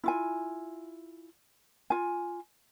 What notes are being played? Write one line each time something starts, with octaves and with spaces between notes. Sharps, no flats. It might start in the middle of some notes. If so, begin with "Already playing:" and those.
E4 F4 G#5
F4 G#5